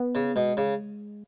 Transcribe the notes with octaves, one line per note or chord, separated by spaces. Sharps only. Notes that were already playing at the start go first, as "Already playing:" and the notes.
Already playing: B3
C#3
B2 G#3
C#3